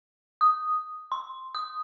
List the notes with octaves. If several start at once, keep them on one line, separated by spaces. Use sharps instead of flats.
D#6
C6
D#6